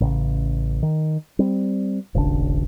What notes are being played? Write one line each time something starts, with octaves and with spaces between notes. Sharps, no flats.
A1 C#3
D#3
G3 C4
D#1 G#1 C#3 D4